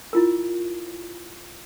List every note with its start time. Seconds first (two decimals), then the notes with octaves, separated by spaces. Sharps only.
0.13 E4 F4 A#4